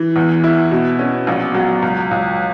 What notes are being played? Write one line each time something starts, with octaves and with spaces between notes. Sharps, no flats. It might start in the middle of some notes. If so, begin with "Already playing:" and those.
Already playing: E3
E2
E4
B2
C#4
A#1
F#3
C#2
C#2